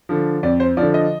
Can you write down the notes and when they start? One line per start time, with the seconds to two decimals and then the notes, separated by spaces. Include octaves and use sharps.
0.09 D3 F3
0.43 F2 D5
0.60 C5
0.77 D3 F3 D5
0.94 D#5